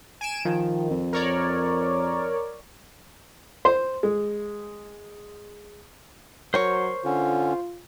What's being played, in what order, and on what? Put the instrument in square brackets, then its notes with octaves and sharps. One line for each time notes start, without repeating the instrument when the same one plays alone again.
[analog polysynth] G#5 D7 E7
[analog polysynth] D#3 [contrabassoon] F3
[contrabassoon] F2
[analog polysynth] A#4 C#5 D5
[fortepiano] C5
G#3
[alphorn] F#3 [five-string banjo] A#4 C#5 [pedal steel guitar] C5 C#6
[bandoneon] D3 C#4 [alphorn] F4